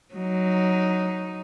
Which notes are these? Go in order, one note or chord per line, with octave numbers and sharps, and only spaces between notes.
F#3 D#4